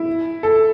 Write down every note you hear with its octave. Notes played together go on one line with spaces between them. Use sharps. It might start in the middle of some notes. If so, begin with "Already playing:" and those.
Already playing: E4
A4